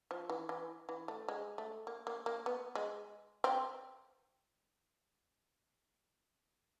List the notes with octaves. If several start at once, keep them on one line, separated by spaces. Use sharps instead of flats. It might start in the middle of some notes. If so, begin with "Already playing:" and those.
F3
E3
E3
E3
A3
G#3
A3
A#3
A#3
A#3
B3
G#3
C4